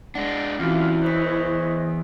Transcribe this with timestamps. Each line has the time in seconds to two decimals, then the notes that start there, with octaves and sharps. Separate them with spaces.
0.15 G#3 D4 F#5
0.59 E2 E3 C4 C#4 F4 F#4 F5
1.02 C5 C#5 D#5 F#6 B6